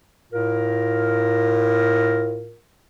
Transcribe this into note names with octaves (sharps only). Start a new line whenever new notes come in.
A2 F4 A#4